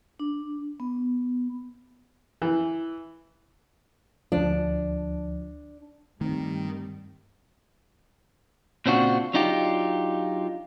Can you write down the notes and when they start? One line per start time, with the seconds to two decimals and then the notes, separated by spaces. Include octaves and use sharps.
0.19 D4
0.80 B3
2.42 E3
4.32 D2 F3 D4
6.21 G2 D#3 G3 A3 A#3 C4
8.86 A#2 C#3 C4 D4 F4 F#4
9.33 F#3 D4 D#4 F4 G4